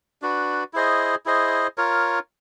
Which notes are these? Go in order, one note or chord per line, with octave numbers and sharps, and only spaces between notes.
D4 F#4 B4
E4 G#4 C5 D#5
E4 G#4 C5 D#5
F4 A#4 C#5